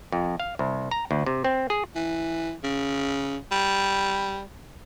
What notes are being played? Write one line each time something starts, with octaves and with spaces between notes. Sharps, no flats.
F2
F5
C2
A#5
D2
C3
C4
G#4
E3
C#3
G3